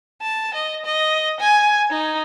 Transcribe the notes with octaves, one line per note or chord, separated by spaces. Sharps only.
A5
D#5
D#5
G#5
D#4